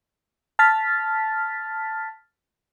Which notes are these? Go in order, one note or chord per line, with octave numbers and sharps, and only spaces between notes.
A5 F6 A6 B6